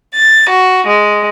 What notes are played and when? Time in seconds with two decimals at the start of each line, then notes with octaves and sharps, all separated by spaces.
0.14 A6
0.49 F#4
0.86 G#3